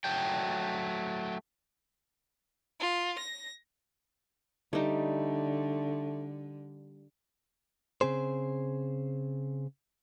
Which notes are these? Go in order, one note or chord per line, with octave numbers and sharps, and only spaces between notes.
F#3 A3 G5
F4
A#6
D3 G3 A3 D#4
C#3 C4 G#4 C5